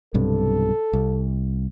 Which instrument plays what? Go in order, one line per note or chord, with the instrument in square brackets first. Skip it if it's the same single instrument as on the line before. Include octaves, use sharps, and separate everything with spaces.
[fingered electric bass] B1 G2 C3 [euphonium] A4
[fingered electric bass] C2